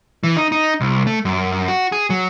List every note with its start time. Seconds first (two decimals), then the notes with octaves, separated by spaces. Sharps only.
0.23 E3
0.37 D#4
0.52 D#4
0.81 C2
1.07 A3
1.25 F#2
1.68 F#4
1.92 G#4
2.10 F#3